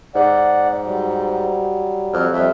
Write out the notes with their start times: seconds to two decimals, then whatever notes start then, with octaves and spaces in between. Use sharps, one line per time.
0.15 G#2 D5 F#5
0.84 F#3 G3
2.13 F2
2.33 F2 G3 E5